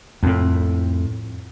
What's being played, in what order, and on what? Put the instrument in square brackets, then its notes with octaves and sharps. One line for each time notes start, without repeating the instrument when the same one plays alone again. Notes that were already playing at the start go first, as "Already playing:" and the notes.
[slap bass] F2 A2